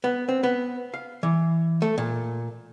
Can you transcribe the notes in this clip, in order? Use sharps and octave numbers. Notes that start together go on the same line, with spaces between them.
B3
C4
B3
F5
E3
A3
A#2